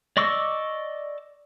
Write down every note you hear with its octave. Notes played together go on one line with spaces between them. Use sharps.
D5 D#5 C#6 D6 E6